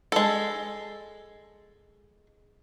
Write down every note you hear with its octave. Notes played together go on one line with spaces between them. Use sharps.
G#3 A4